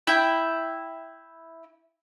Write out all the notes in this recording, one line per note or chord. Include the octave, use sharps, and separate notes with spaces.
E4 E5 G5